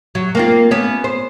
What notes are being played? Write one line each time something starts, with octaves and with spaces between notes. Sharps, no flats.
F#3
A#3 C4 F4
B3 C#4
C5